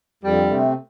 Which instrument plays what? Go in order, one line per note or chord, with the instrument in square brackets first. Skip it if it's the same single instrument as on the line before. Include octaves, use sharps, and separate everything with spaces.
[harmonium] F2 [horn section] D3 G3
[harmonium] C3 A3 C4